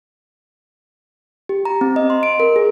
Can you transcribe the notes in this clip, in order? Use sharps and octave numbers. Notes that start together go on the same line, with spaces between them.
G4
A#5
C4
D#5
C6
D7
A#4
G#4